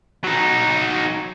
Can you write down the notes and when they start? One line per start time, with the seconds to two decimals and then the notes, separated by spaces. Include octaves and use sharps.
0.24 F#3 D#4